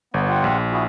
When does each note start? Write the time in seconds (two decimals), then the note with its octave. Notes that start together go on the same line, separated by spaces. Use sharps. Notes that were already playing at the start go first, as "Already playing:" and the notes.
0.14 G1 B3
0.29 F4 G4 F#5
0.44 A#1
0.72 E4 F#4 G#4